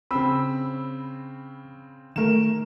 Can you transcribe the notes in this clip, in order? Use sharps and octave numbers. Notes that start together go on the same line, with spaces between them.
C#3 C4 B5 E6
D#3 A3 A#4 E7